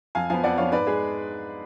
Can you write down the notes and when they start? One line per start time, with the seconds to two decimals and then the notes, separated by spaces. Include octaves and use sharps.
0.15 F2 F5 G#5
0.30 F3 B3 F5 G#5
0.44 F2 D5 F#5
0.58 F3 B3 C#5 F5
0.72 G#2 B4 D5
0.87 G#3 G#4 B4